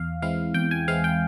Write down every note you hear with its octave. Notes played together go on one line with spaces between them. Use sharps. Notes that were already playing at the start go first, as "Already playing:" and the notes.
Already playing: E2 F5
E3 G#3 C4 E4 F5
E2 G5
G#5
E3 G#3 C4 E4 F5
G5